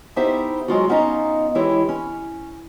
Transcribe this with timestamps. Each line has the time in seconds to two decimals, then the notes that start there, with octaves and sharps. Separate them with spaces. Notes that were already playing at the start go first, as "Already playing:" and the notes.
0.16 B3 D#4 E4 G4 C5 E5
0.68 F#3 G#3 F4 F#4
0.89 B3 C#4 D#4 F4 D#5 A#5
1.55 E3 G#3 E4 G4 C#5
1.89 C#4